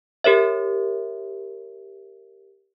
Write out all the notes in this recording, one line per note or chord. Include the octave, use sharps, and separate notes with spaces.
G4 A#4 C#5 E5